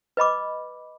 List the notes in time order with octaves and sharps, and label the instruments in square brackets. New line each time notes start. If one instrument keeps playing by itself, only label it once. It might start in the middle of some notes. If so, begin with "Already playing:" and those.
[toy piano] B4 D#5 B5 D6